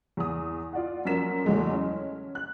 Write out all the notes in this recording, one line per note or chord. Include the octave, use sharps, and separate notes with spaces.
E2 D#6
F4 D5 F#5
F#2 F3 F#3 A#4 B6 E7
E2 F#3 G#3 A3
C#4
F#6